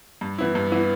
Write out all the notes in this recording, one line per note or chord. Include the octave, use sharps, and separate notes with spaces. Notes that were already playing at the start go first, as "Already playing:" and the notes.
G2
E3 B3 E4
G2
E3 B3 E4